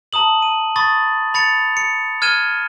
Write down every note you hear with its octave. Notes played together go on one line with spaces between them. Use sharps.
A5 A#5 D#6 F#7
D#7
B5 C#6 D#6 A6
B5 A6 C#7 F7
C#7
F6 G#6 D#7 E7 G7